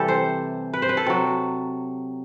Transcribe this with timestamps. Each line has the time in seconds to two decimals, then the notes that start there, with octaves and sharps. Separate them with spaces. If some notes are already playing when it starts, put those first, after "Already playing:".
Already playing: C3 E3 G3 G4 A4
0.08 C5
0.74 B4
0.82 C5
0.89 B4
0.97 A4
1.06 C3 F#3